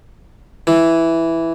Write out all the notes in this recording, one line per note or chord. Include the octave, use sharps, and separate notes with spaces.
E3